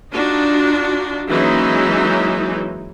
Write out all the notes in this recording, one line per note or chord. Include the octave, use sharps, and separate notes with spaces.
D4 D#4 F4 F#4
E3 F#3 G#3 A#3 C#4 D#4